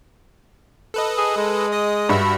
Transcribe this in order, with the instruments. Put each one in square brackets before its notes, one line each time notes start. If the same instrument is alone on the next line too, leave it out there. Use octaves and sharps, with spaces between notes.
[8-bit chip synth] A4 B4 D#5
[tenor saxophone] G#4
G#3
[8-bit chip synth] D#5 D#6
[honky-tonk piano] G2 [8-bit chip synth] D4 F#4 E5